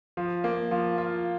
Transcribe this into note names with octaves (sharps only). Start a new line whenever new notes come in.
F3
A#3
F3
F4